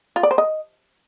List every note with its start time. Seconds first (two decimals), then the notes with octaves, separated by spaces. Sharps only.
0.16 F4
0.23 D5
0.31 C5
0.38 D#5